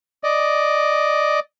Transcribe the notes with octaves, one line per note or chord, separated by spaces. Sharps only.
D5 D#5